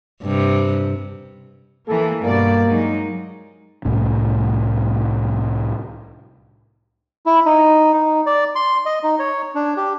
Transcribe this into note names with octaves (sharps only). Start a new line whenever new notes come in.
G2 C3
E3 A#3 A4
G2 B2 A#3 D5
F#3 G#3 D#4
C2 A2 C#4
E4
D#4
D#4
D5
C6
D#5
D#4
C#5
D4
G4